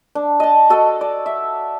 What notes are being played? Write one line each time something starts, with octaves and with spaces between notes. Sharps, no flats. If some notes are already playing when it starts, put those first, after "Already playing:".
D4
D#5 A5
F#4 A4 D#5
D5
E5